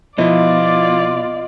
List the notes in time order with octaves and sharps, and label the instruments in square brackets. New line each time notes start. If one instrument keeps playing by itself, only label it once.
[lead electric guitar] B2 [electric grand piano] F3 E4 [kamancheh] F4 D5 [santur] D#5